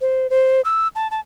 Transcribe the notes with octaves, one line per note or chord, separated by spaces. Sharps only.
C5
C5
E6
A5
A5